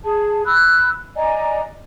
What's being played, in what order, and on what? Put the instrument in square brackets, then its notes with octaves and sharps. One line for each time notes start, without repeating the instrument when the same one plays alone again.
[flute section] G#4 A5
B5 E6 F#6
D5 D#5 G#5 A#5